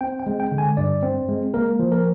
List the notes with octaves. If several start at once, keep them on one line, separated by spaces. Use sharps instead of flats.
C4 G5
G5
G#3
G5
D3
G#5
G2 D5
C4
G#3
A#3 A#4
F3
A#4